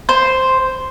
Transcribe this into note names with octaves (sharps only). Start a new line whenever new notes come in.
C5